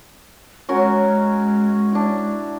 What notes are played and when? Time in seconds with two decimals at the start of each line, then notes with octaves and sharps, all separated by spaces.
0.69 G#3 C#4 F#4 A#4
1.92 D4 E4